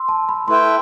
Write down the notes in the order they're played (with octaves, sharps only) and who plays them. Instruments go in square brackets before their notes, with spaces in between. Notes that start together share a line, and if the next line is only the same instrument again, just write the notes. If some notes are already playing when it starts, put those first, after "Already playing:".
Already playing: [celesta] C6 E6
A5
B5
[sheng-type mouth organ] A3 E4 B4 E5 G5 [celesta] C6